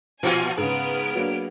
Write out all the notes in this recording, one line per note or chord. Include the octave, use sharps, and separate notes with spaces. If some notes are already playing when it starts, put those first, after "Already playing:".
A#2 F3 F4 F#4 G#5
G#2 C#3 B3 G#4 F6 D7
F#3 A#3 D4